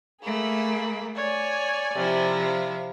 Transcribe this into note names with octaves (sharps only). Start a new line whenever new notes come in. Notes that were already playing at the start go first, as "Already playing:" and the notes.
A3 A#3 G#4 B5
C#5 D5 G#5
C3 F3 E4
F5